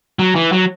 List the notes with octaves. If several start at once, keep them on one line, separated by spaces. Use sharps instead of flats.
F#3
E3
F#3